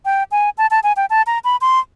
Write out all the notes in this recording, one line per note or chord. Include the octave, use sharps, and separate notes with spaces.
G5
G#5
A5
A5
G#5
G5
A5
A#5
B5
C6